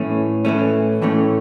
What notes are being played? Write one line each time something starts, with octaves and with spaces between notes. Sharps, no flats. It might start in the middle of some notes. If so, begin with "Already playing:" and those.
Already playing: A2 E3 A3 C#4
A2 E3 A3 C#4
A2 E3 A3 C#4